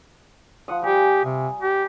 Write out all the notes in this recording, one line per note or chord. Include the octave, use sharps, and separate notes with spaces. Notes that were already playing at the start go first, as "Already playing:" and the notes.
F3 F#5 D#6
G3 G4 G#5
C3
G4